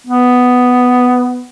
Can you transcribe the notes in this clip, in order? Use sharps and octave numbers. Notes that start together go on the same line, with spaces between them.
B3